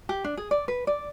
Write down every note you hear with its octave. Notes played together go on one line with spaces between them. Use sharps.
G4
D4
G#4
D5
B4
D5